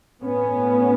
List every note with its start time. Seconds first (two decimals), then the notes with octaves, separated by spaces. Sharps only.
0.24 A2 B3 C#4